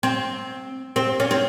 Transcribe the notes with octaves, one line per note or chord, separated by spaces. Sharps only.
C4
C4
C#4
C4